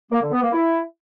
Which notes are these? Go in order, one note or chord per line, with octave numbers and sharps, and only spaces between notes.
A#3
D3
B3
A#3
E4